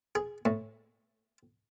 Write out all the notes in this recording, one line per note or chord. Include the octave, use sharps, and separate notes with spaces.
G#4
A2